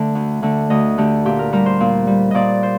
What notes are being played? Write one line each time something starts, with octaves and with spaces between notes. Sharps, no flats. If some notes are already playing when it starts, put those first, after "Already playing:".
Already playing: D3 A3
D2
D3 A3
D2 D#5
D3 A3 G4
A#2 G4
A#4
G3 A#4
C5
A#2
G3
A#2 D5 D#5
C5